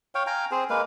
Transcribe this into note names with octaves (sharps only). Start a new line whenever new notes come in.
C#5 F5 G5
F5 G5 G#5 A#5
C4 G#4 C5
G#3 A#3 B4 F5